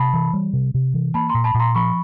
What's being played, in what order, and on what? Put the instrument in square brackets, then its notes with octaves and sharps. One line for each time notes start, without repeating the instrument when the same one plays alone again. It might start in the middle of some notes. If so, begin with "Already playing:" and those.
Already playing: [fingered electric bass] C3 [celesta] A5 B5
[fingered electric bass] E3
G3
C3
C3
E3
[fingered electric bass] A#3 [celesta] A5 B5
[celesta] A#5 C6
[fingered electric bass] A#2
[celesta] A5 B5
[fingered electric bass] A#2
[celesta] A#5 C6
[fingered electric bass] F3 [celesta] B5 C#6